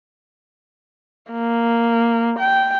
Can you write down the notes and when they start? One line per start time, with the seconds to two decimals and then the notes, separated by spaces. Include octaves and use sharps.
1.32 A#3
2.39 G5